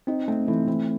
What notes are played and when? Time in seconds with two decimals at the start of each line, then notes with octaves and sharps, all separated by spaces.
0.07 C4 D#4
0.28 A3 C4
0.48 E3 A3
0.67 E3 C4